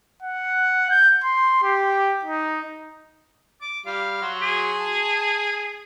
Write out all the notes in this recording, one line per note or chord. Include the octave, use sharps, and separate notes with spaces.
F#5
G6
C6
G4
D#4
D6
G3 F5
F#3 F#4 C6
G#4
A5